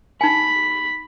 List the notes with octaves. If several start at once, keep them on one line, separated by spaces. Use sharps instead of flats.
D#4 G#5 B5